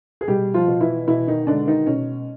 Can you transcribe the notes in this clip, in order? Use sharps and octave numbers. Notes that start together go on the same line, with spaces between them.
G#4
B2 G3 G4
F3 F4
B2
E3 E4
B2 E3 E4
D#3 D#4
D3 G#3 D4
D#3 D#4
B2 C#4